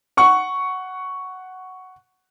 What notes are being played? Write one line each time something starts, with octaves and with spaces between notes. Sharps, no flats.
F#5 C#6